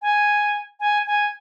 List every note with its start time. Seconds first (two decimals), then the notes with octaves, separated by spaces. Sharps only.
0.02 G#5
0.80 G#5
1.07 G#5